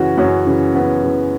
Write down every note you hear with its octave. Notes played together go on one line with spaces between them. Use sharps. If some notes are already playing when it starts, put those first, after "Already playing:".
Already playing: F#2 C#3 E3 C#4 F#4
F#2 C#4 F#4
C#3 E3
F#2 B3
C#3 E3